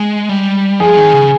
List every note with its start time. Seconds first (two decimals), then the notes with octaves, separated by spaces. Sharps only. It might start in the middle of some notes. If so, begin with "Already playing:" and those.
Already playing: G#3
0.29 G3
0.80 F3 G#4
0.97 D#3
1.13 C#3